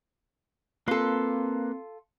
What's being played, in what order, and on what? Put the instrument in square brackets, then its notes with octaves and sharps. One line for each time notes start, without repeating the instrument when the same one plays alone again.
[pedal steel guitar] A#3 B4 C6 [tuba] C4 [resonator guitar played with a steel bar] F4 A4